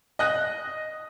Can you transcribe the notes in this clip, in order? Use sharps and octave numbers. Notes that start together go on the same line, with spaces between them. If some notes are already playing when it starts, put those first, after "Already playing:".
D#5 F#6 A#6